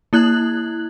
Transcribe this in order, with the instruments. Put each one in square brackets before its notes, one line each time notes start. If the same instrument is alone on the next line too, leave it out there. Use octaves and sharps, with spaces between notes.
[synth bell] A#3 E4 F#6 G#6 F#7